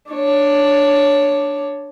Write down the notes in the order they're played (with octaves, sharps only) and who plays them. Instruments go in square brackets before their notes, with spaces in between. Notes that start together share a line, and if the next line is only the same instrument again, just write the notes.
[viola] D4 C#5